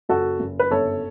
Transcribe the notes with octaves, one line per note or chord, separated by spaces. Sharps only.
F#1 F#4 A4
F#1
B4
G1 A4 C#5